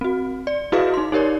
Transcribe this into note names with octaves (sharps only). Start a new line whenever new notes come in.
C4 F#4
D5
E4 F#4 G#4 B4 D#5 F5
D#4 C6
D#4 G4 A#4 C#5 D5